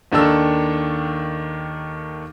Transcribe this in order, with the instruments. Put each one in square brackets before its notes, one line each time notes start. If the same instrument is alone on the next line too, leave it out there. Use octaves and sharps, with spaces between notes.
[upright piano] D#2 D#3 D4 A4 E6